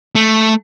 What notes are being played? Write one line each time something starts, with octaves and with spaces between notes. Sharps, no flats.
A3